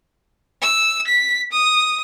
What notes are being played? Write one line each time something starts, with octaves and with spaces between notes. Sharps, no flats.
E6
B6
D#6